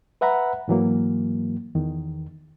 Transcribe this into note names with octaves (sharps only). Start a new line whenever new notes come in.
B4 E5 F#5 A#5 B5
G#2 E3 F#3 A#3
E2 D#3